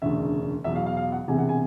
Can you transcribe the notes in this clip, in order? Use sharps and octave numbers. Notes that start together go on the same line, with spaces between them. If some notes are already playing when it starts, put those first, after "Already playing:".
E1 D2 C#3 E5
E2 B2 F#3 E5
F5
F5
F5
F#5
E1 E2 C3 G#5
F#5
G#5